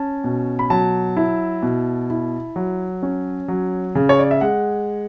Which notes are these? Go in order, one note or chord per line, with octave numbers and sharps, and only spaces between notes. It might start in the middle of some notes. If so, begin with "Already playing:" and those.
Already playing: C#4 A5
B2
B5
F#3 A5
E4
B2
E4
F#3
C#4
F#3
C#3
C#5
D5
E5
G#3 F#5